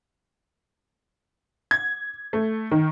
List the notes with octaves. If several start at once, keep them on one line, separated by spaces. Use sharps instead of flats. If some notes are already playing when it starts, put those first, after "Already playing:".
G#6
A3
D#3